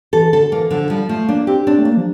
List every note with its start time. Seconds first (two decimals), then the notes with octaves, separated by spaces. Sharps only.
0.13 E3 A4
0.32 D3 A4
0.51 E3 A#3
0.71 D3 F3
0.90 F3 G3
1.09 F3 A3
1.28 A#3 D4
1.47 C4 G4
1.67 C4 D4
1.78 A3
1.85 A#3 D4
1.97 F3